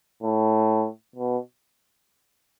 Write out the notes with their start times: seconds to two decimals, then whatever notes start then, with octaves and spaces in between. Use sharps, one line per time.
0.23 A2
1.16 B2